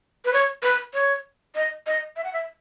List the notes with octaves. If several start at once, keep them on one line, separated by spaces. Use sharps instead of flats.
B4
C#5
B4
C#5
D#5
D#5
E5
F#5
E5